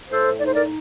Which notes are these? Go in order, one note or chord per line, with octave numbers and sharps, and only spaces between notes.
A2 A4 C5
D#4 D5
C5
A#4 D5